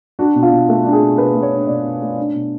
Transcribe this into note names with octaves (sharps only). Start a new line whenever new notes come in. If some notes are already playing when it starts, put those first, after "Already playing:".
D4 F#4
B2
F4
B2
A3
D4
G#4
B2
B2 B4
A3
C#5
D4
B2 D5
B2
A3
D4
B2